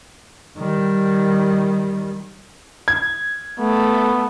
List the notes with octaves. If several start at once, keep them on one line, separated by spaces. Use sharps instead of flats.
D#3 G3
G#6
A3 B3